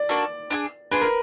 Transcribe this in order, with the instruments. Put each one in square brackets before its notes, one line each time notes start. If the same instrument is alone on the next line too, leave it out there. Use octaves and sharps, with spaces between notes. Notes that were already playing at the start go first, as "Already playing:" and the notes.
Already playing: [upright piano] D5
[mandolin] A#3 D4 F#4 A4
D4 F4 G#4
[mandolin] D4 F4 G#4 [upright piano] B4
[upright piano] A#4